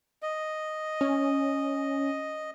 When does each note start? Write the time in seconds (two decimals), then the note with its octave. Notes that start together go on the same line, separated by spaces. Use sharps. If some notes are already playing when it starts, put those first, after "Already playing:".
0.22 D#5
1.01 C#4